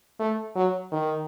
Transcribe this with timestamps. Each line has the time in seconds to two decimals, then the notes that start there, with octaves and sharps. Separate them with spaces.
0.20 A3
0.56 F#3
0.92 D#3